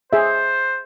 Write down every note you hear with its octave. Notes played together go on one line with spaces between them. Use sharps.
G#4 C5 E5